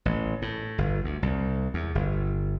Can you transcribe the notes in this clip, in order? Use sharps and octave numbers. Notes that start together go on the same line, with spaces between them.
A1
A2
G1
D2
C2
E2
G1